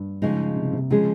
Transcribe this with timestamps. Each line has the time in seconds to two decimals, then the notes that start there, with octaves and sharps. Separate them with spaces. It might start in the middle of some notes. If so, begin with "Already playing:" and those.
Already playing: G2
0.22 C#3 F3 G#3 D#4
0.56 C3
0.73 C3
0.90 C#3 F3 G#3 C#4 G#4